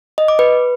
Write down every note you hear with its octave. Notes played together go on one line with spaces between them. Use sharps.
D#5
D6
B4